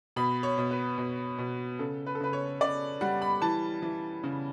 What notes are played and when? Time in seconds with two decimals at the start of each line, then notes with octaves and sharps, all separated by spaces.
0.16 B2 B5
0.43 C#5
0.58 B2
0.71 B4
0.98 B2
1.38 B2
1.79 C#3 A4
2.06 B4
2.15 A4
2.20 C#3 B4
2.33 C#5
2.61 C#3 D5
3.01 G3 F#5
3.22 B5
3.42 E3 A5
3.82 E3
4.23 C#3